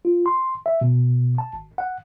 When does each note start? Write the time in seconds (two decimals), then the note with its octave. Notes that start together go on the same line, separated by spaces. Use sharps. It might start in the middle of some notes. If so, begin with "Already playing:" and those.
0.05 F4
0.26 C6
0.66 E5
0.81 B2
1.38 A5
1.53 G#1
1.78 F#5